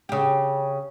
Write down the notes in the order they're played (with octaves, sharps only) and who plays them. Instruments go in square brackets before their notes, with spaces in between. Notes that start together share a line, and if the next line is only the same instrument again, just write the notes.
[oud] C#3 G4